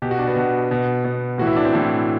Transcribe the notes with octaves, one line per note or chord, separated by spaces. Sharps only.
B2 G4
F#4
D4
B3
B2
B2
B2 B3
A2 E3 F#4
E4
D4
C4
A2 E3